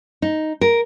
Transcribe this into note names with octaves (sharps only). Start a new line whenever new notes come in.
D#4
A#4